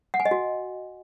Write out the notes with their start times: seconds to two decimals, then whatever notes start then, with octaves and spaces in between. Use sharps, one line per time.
0.14 F#5
0.20 G#5
0.26 D#5
0.31 F#4